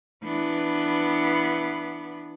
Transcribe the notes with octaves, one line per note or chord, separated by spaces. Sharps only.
E3 B3 D4